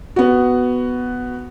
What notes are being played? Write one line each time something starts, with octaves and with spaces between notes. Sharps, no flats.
B3 F#4